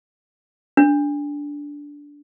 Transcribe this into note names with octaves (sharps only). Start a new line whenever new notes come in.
D4